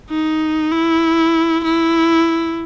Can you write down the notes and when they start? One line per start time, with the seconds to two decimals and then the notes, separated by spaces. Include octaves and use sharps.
0.10 D#4
0.71 E4
1.64 E4